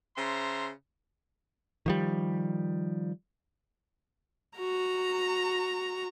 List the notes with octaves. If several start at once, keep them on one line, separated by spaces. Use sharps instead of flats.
C#3 C5 E5 A#5 C6
D#3 F3 G3
F#4 A#5